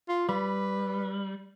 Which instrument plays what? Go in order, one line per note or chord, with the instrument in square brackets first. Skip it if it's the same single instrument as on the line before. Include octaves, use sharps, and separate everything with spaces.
[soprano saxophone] F4
[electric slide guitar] G3 [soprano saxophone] B4